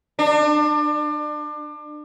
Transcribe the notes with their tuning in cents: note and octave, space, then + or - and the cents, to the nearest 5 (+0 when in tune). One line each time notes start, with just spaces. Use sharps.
D4 +30